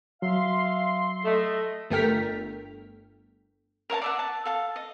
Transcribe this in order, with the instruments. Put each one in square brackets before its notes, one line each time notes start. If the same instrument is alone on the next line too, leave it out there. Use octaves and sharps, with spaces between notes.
[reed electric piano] F#3 [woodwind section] E5 F5 [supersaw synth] C6
[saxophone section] A3 [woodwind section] A4 D#5
[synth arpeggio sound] G1 A3 A#4 G5 F6 B6
[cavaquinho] A#4 C#5 F5 A5
D5 E5 F#5
A5
A4 F5 A5
D#5